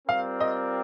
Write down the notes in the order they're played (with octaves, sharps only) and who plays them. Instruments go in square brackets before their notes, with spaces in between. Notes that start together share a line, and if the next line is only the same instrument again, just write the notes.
[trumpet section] G3 C4 F4 A#4 D5 [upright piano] F5
[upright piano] D#5